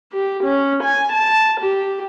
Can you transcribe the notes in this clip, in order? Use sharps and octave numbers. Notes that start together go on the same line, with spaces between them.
G4
C#4
G#5
A5
G4